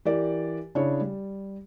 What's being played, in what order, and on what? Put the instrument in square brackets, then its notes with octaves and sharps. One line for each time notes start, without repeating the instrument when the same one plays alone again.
[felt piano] E3 G4 A#4 D5
C#3 D4 E4 G#4 C#5
G3